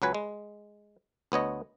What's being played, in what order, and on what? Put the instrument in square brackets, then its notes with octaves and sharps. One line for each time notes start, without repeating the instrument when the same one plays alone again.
[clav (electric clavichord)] C#2 F#3 B4 G#5
G#3
D2 B3 C#5 D#5